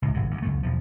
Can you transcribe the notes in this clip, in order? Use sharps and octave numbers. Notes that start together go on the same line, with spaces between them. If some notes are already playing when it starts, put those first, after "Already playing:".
C#2 A2
G#1 G2 C3
D2 G2
C#2 F#2 A3
B1 E2 F3